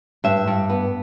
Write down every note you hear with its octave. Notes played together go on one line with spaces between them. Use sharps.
G2 E5
G2
B3